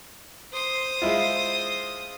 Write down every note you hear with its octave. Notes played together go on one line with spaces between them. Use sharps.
C5 D#6
G#3 E4 F4